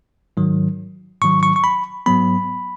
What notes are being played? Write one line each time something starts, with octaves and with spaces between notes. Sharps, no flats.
G#2 D#3 F#3
G#2 D#3 F#3 C#6
C#6
C#6
B5
G#2 F#3 B3 B5